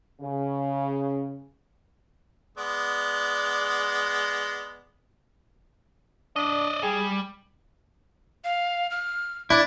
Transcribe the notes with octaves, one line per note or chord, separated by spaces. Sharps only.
C#3
G#3 B3 D5
D4 D5 D#5
G3 G#4
F5
F6
D4 E4 D5